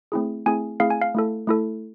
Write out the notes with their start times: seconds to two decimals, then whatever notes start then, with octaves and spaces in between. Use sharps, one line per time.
0.12 A3 C4 E4 G#4
0.46 A3 C4 E4 G#4 G#5
0.80 A3 C4 E4 G#4 F5
0.90 G#5
1.02 F5
1.14 A3 E4 A4
1.47 A3 E4 A4